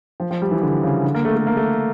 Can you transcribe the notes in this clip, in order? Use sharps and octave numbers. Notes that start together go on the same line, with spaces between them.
F3
F3
G3
E3
D3
C#3
D3
A#3
A3
A3
A#3
A3